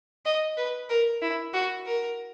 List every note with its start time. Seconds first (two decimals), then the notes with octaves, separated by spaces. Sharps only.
0.25 D#5
0.57 B4
0.90 A#4
1.22 E4
1.54 F#4
1.86 A#4